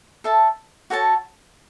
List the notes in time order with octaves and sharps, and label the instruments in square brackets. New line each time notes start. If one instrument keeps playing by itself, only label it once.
[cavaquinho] A4 E5 A5
F#4 A4 C#5 A5